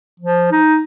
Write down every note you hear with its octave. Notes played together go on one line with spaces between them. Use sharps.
F3
D#4